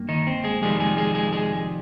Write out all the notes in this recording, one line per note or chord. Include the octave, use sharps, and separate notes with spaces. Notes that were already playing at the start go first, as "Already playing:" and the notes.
Already playing: G2 A#3
D#3 D#4
C4
G#3 G#4
F2 C3 D#3 G3 G#3 A#3 G#4
G#3 G#4
G#3 G#4
G#3 G#4
G#3 G#4